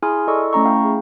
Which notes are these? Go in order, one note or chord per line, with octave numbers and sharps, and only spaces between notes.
E4 G#4 G#5 C6 D#6 F6
E4 A4 D5 D#5 C#6 E6
A3 C#4 A#5 C#6
E4 F5 G5
G#4